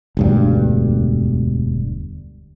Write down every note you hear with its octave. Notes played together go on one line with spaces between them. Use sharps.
E1 D2 G2